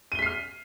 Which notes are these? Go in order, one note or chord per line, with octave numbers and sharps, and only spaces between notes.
F6 B6 C7 D#7 G7